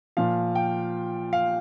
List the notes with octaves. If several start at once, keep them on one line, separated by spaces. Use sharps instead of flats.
A#2 F3 F5
G5
F5